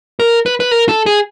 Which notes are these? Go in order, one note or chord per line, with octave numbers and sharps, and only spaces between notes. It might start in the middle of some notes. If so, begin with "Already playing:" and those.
A#4
B4
B4
A#4
A4
G#4